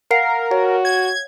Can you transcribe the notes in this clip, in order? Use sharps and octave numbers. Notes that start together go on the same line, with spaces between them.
A#4 F5 F#5 C7
F#4 C#5
G#6